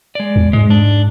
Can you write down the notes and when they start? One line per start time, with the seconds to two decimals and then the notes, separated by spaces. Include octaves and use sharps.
0.15 G#3 D5
0.36 E2
0.53 G#2 G#3
0.70 D4